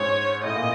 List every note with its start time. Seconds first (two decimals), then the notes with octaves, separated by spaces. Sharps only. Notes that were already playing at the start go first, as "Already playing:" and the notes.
Already playing: G#2 C#5
0.43 A2 D#5
0.55 A#2